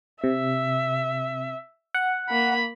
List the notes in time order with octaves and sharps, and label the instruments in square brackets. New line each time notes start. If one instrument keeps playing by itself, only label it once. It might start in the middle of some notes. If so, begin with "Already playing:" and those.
[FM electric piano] C3 [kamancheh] E5
[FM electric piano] F#5
[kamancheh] A#3 B5